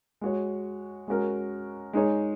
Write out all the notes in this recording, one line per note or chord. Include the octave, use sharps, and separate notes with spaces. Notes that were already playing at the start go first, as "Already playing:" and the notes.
G#3 F#4 C#5
G#3 C#4 F#4 A#4
G#3 D#4 G#4 C#5